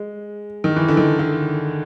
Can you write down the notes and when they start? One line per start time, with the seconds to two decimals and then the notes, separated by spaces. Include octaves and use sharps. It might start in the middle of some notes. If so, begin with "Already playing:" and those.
Already playing: G#3
0.64 D#3
0.76 E3
0.88 D3
0.97 D#3
1.19 D3